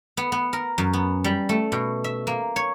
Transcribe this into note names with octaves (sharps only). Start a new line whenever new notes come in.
B3
B3
A#4
F#2
B3
G3
A3
B2
E5
A#3
C#5